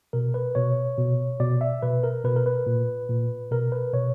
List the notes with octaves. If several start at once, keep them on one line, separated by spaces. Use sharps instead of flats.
B2 A#4
B4
B2 C#5
B2
B2 D5
E5
B2 B4
A#4
B2 B4
A#4
B4
A#2
A#2
B2 A#4
B4
B2 C#5